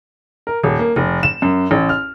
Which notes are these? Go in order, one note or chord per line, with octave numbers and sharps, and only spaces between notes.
A#4
D#1
A#3
F1
E7
F#2
A1
F6